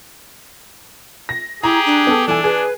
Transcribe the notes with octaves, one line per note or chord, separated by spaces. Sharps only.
A#6
E4 G4 G#4 A#5
D4
B3 A4
E3 D4 A4 G#5
G#4 B4